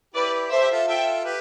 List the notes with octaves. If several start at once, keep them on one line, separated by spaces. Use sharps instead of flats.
E4 G4 B4 D5
A4 C5 E5
G4
F4 A4
F4 A4 E5 G5
G4 B4